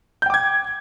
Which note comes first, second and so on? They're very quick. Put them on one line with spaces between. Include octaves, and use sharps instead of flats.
G6 G5 D6 G#6